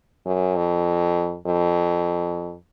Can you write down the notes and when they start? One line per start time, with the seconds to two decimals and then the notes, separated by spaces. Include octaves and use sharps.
0.26 F#2
0.56 F2
1.46 F2